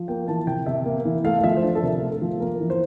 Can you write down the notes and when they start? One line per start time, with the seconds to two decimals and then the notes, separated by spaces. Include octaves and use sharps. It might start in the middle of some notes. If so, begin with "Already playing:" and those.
Already playing: F3
0.08 A#3 G5
0.28 E3 A5
0.47 C3 G5
0.66 C3 E5
0.85 A#3
1.05 E3
1.24 A3 F5
1.39 F5
1.44 F3 E5
1.57 C5
1.63 D4 D5
1.75 A4
1.83 C3 A#4
2.02 A3
2.12 A4
2.22 F3
2.40 A#3 A#4
2.60 E3
2.70 C5